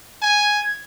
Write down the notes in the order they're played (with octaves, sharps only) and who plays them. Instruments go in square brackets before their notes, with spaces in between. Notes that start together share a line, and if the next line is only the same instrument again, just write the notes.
[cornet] G#5 [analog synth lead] G#6